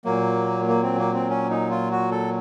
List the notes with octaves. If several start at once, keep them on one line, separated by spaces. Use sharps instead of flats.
A#2 F#3 A#3
A#3
C4
A#3
C4
C#4
D#4
F4
F#4
A4